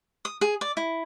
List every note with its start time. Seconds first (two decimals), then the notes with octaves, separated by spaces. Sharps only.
0.25 D#6
0.41 G#4
0.61 D5
0.77 E4